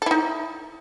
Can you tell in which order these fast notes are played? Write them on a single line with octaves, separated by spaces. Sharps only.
A4 E4 D#4